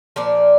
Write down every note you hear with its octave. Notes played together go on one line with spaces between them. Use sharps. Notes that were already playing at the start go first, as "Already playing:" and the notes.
A#2 F3 D5